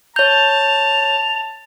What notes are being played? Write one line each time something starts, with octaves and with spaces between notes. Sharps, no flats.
C#5 A5 G6 F7